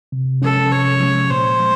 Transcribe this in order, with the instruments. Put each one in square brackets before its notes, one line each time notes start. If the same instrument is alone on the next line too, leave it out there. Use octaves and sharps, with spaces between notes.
[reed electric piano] C3
[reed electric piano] F3 G#3 C#4 [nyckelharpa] A4
[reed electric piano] C3 [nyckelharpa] C#5
[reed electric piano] F3 G#3 C#4
[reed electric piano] A#2 [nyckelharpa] C5
[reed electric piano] F3 G#3